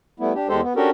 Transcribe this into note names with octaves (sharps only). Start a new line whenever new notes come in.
G3 A3 B3 E4
D4 G4
E2 G#3 G4 A4 C5
B3
C#4 D4 F#4 G4 A4 A#4